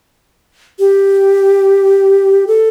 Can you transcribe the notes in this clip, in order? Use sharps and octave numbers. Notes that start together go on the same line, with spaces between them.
G4
A4